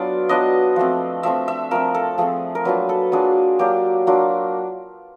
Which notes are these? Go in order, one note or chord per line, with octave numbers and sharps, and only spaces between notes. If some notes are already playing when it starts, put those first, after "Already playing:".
Already playing: F#3 B3 D4 F4 D5
F#3 B3 D4 F4 D#5
F3 A3 C4
F3 A3 C4 E5
E5
F3 A3 C4 A#4
A4
F3 A3 C4 G#4
A#4
F#3 A#3 D4 F4 B4
A4
F#3 A#3 D4 F4 G#4
F#3 A#3 D4 F4 G4
F#3 A#3 D4 F4